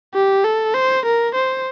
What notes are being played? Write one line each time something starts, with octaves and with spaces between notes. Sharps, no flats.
G4
A4
C5
A#4
C5